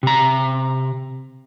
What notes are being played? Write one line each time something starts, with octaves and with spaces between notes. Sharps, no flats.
C3 A#5